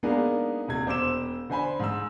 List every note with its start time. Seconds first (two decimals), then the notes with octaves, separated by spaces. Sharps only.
0.03 G#3 A#3 B3 D4 D#4 G#4
0.68 D#1 C3 G#6
0.86 E1 C5 D6 E6 E7
1.50 D3 C5 G#5 B5
1.80 G#2 E6